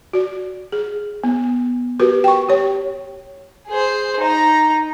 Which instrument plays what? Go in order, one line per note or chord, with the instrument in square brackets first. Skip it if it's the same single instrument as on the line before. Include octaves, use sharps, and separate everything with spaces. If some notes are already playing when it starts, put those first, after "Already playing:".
[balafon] F#4 D5
G#4
B3
F#4 G4 A#4 B4
G5 C#6
G4 C#5
[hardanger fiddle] G#4 C5
D#4 A#5